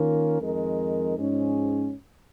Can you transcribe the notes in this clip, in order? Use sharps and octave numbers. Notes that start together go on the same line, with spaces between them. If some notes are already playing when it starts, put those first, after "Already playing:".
Already playing: D#3 A#3 C#4 F4 A#4
F2 D#3 G#3 D#4 A#4
G#2 F3 G#3 C#4